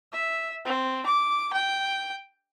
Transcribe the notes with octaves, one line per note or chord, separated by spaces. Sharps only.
E5
C4
D6
G5